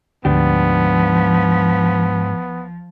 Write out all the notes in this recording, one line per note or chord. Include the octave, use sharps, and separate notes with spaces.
D2 G#2 F3 B3 D4 G4